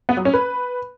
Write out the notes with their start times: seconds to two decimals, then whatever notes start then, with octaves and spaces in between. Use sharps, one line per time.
0.09 B3
0.17 F#3
0.25 C#4
0.34 B4